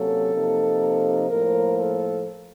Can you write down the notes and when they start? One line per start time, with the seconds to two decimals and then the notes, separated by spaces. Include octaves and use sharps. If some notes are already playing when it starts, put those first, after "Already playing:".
Already playing: C3 F#3 A#3 C#4 A4
0.32 C3 F3 A#3 D#4
1.28 A2 F3 A#3 A#4
1.77 A4